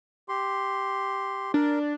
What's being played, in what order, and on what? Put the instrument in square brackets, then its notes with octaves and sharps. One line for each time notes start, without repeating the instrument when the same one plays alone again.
[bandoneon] G4 C6
[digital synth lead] D4 [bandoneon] A#4